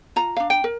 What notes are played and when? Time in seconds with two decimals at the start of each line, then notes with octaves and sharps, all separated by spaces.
0.16 F4 A#5
0.37 D4 F5
0.50 G5
0.64 A#4